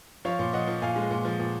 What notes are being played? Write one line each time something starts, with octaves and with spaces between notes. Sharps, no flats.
F3 C#5 F5
A#2
F3 D#5 F#5
F3
A#2 F5 G#5
G#3
A#2
F3
A#2